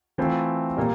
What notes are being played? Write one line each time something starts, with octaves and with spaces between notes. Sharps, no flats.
E3 A3 C4 F4
A#2 G3 A#3